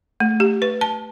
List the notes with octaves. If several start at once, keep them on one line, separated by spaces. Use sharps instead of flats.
A3
G4
B4
A5